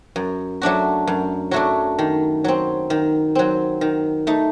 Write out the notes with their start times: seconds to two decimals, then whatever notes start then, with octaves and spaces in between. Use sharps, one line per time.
0.16 F#2
0.62 F#3 A3 D4 F#4
1.07 F#2
1.51 F#3 A3 D4 F#4
1.99 D#3
2.44 F#3 C4
2.90 D#3
3.35 F#3 C4
3.81 D#3
4.27 A3 D#4